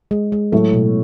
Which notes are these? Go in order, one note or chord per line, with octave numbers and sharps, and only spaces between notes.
G#3
G#3
A2 F#3 A3
B2